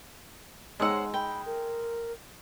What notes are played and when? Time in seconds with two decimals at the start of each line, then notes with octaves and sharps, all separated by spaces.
0.80 G#3 D#4 C5 C#5 F#5 E6
1.14 G5 B5
1.46 A#4